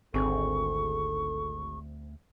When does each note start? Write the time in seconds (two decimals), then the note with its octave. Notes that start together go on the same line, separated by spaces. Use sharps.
0.14 G#1 D2 C4 G#4 A4 C#6